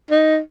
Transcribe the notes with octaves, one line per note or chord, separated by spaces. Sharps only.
D#4